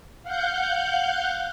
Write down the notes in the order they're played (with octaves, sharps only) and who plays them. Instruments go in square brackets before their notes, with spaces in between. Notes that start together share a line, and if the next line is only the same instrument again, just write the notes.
[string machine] F5 F#5 F#6 G6